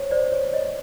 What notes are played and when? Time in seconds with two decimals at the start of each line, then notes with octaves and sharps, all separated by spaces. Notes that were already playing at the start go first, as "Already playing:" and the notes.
Already playing: C5 C#5
0.11 C5 D5
0.32 C#5
0.53 C#5 D#5